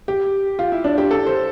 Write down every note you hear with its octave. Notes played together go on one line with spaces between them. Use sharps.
G4
F4
E4
D4
G4
A4
C5